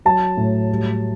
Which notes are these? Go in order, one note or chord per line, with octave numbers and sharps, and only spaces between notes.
F#3 A5
A2
G3